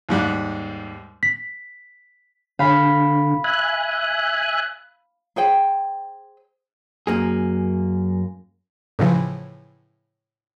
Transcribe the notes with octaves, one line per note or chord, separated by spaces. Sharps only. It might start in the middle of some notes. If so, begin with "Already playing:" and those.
D#2 G#2 G3 F#5
B6
D3 F5 B5
E5 G#5 F#6
G#4 C5 G5
F#2 A#3 G#4
A2 C#3 E3 F3